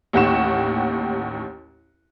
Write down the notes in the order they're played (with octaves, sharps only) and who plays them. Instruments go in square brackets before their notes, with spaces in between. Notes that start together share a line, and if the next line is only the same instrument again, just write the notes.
[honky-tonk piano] A1 D#2 G4 F#5 C#6 E7